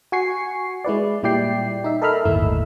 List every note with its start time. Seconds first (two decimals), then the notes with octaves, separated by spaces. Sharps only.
0.12 F#4 G#5 C#6 C7
0.84 G#3 E4 B4 D5
1.23 A#2 G3 E4 D5 G5 C7
1.84 D#4 E5
2.02 A4 A#4 D#5 E5 B5 F6
2.25 G1 D#2 A2 A3 E4 E6